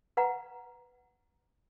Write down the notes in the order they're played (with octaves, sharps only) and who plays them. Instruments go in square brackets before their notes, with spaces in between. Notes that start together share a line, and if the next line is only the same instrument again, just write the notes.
[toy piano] B4 F#5 A#5